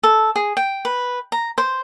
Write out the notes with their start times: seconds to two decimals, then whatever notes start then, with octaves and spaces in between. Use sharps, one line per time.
0.03 A4
0.36 G#4
0.57 G5
0.85 B4
1.32 A#5
1.58 C5